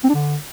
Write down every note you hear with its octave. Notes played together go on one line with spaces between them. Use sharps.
C4
D4
D3